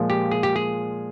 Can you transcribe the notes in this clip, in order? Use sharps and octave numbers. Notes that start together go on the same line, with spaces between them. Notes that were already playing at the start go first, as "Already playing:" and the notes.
Already playing: A#2 F3 G#3
G4
G#4
G4
G#4